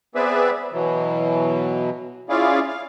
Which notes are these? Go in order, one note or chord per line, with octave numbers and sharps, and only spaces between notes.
B3 C4 G#4 B4 D5 E5
B2 E3 F#3
C#4 E4 F4 G#4 D5 F5
F5